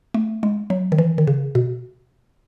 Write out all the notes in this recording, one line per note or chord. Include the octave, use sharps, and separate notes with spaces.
A3
G#3
F#3
D#3
E3
D#3
C#3
B2